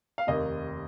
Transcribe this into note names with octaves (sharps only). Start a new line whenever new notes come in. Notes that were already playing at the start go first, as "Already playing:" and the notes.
F5
F1 D#2 D#3 A#3 D#5